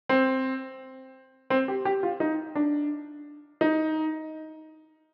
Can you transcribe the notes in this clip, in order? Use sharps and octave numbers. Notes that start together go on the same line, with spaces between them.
C4
C4
G4
G4
F4
D#4
D4
D#4